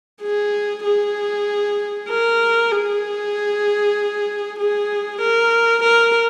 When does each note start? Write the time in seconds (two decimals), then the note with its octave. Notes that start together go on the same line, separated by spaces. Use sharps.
0.22 G#4
0.84 G#4
2.09 A#4
2.72 G#4
4.60 G#4
5.22 A#4
5.84 A#4